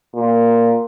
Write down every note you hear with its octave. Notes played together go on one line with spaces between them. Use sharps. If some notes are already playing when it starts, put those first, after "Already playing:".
A#2